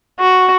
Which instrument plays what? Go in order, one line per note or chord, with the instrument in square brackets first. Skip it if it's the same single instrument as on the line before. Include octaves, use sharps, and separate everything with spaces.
[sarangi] F#4